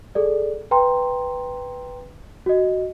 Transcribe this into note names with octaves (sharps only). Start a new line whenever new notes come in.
G#4 A4 D5
B4 G5 A#5 C6
F#4 D#5